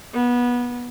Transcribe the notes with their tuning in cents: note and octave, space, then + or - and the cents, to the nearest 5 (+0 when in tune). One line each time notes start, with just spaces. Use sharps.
B3 -20